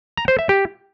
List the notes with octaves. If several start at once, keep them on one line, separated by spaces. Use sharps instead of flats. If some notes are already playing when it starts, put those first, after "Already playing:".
A#5
C5
E5
G4